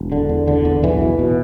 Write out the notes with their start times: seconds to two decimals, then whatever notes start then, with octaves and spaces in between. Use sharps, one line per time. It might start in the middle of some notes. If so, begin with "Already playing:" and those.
Already playing: E1
0.12 D3
0.29 E2
0.48 D3
0.65 E2
0.83 B1 E3
1.01 B2
1.19 B2